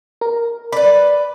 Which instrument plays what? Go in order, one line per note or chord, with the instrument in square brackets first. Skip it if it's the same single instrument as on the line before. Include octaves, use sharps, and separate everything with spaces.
[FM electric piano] A#4
[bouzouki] B4 D5 [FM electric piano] B5